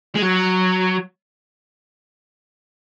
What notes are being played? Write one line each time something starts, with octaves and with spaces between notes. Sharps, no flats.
G#3
F#3